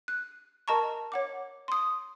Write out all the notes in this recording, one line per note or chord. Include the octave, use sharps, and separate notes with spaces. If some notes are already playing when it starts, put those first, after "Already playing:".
F#6
A#4 D#5 A5 A#5 C#6
C#5 F#5 D6
C6 D#6